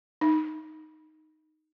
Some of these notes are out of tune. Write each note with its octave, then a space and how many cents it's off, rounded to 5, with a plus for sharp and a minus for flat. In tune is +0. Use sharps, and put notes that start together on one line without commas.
D#4 -5